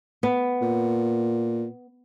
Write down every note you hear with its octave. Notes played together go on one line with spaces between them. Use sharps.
B3
A#2